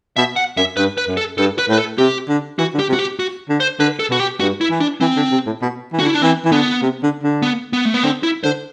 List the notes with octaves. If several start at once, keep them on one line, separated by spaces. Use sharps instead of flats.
B2 E5
F#5
F#2 E5
G2 B4
B4
F#2
A4
G2 A4
B4
A2
B4
A4
C3 G4
D3
E3 F#4
D3
G4
C3
F#4
G4
F#4
D3
C5
D3 B4
A4
B2 F#4
G4
G2 F#4
E4
E3
D4
E3 C4
D3
C3
A2
B2
E3
D3 F#4
E4
D4
E3 C4
E3
D3 B3
C3
D3
D3
B3
B3
A3
B3
D3 C4
E4
D3 C5